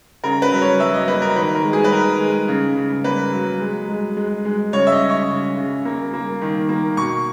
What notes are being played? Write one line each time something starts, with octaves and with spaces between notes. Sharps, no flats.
C#3 A#4
B4
F#3
C#5
F#3 E5
D#5
A#3 B4
A#4
D#3 B4
A#4
G#3
G#4
B4
D#3 A#4
G#3
C#3
C#3
A#3 B4
F#3
G#3
G#3
G#3
G#3
C#3 C#5
E5
D#5
C#3
C#6
C#3
C#3
A#3
A#3
D#3
A#3
B2 C#6